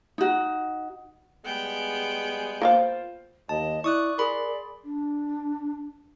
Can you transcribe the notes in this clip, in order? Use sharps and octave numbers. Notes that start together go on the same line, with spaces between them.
D#4 F#4
G3 G#3 B3 G#4 G5
A#3 F4 C5 E5 F5
D#2 D#5 A5
E4 D5 C#6 D#6 F#6
G#4 A#4 D5 B5 C6
D4